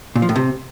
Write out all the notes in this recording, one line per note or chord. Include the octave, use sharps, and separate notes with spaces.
A#2
F3
A2
C3